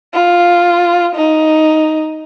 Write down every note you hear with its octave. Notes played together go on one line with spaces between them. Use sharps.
F4
D#4